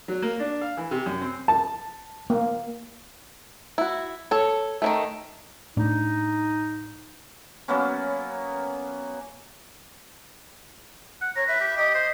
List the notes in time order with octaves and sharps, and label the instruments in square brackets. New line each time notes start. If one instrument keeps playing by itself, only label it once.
[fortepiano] F#3
A#3
D4
F5
E3
C3
F#2
C4
A5
[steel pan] A#3
[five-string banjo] E4 F#4
A4 C#5
D#3 E3 A3
[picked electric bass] A2 D4 [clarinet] D#4
[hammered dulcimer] F#3 A#3 B3 C#4
[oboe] F#5
[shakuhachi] C#5 [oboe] A#5
[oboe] B4 [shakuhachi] E5
[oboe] G4
[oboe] G4 [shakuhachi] D#5
[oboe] C5